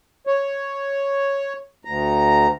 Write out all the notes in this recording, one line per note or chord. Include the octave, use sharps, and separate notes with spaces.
C#5
D2 A#5